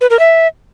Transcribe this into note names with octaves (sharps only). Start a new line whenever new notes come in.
B4
A#4
E5